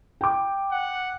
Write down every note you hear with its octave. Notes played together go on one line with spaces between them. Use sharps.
G5 D6
F#5